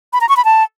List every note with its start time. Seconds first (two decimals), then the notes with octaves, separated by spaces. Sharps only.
0.13 B5
0.21 A#5
0.29 C#6
0.37 B5
0.45 A5